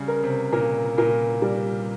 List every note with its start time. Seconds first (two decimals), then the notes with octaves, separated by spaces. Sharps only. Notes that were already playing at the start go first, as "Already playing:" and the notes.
Already playing: C#3 G3
0.08 A#4
0.24 C3
0.53 A#2 A#4
0.98 A#2 A#4
1.42 G3